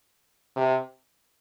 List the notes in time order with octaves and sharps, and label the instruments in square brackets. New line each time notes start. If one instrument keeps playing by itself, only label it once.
[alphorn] C3